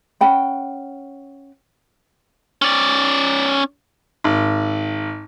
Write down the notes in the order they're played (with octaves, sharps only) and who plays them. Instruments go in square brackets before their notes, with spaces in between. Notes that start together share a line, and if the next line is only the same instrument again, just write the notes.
[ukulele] C#4 F#5 G5 B5
[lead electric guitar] C#4 D5
[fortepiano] G#1